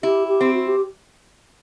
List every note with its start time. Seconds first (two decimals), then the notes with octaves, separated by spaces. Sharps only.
0.03 E4 G4
0.28 G4
0.41 C4
0.54 F#4
0.68 G4